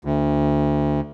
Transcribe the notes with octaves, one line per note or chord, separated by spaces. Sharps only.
D2